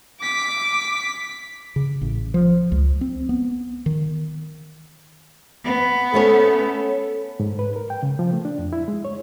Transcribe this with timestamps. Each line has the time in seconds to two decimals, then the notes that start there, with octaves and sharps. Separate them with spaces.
0.22 D6 B6
1.76 C#3
2.01 A1
2.34 F3
2.72 C#2
3.01 C4
3.29 B3
3.86 D#3
5.65 B3
6.14 A3 C#4 A4 C#5
7.40 G#2
7.59 B4
7.76 A#4
7.90 G5
8.03 C#3
8.19 F3
8.33 A3
8.45 D4
8.59 F2
8.73 E4
8.88 G#3
9.05 C#5